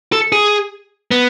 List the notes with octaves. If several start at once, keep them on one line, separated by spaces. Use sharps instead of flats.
A4
G#4
B3